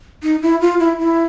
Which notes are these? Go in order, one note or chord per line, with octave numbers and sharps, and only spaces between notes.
D#4
E4
F4
E4
E4